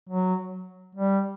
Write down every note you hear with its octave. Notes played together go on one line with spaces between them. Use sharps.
F#3
G3